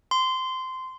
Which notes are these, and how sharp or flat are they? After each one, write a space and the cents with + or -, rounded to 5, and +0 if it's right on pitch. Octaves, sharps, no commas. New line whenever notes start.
C6 -15